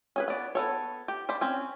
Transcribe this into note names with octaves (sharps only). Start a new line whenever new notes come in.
C#4 G#4 B4
B3 D5
B3 A4 C#5
G4
C5 D5 B5
C4 C#4